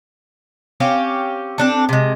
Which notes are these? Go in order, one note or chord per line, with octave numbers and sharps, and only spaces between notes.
C4 C#4 G4 F5
C4 D4 A4
C3 G#3